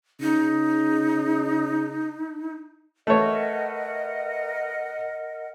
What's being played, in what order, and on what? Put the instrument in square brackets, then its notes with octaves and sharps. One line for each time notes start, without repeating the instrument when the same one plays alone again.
[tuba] C#3 [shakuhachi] D#4
[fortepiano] A3 C#5 [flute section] A#4 D#5 F#5 [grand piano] B4 E5